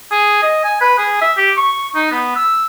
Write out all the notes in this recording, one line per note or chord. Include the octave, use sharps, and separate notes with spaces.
G#4
D#5
G#5
B4
G#4
E5
G4
C#6
D#4
B3
E6